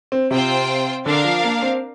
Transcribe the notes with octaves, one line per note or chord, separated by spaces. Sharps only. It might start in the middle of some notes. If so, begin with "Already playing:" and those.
C4
C3 C4 F4 C5 G5
D3 D4 A#4 F5
F3
A#3
C4